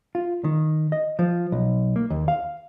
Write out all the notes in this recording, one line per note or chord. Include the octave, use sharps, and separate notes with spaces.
F4
D#3
D#5
F3
B1
A#3
D#2
F5